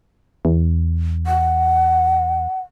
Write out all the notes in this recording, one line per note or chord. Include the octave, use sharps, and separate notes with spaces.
E2
F#5